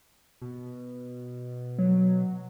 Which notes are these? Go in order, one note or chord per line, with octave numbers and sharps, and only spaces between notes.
B2
F#3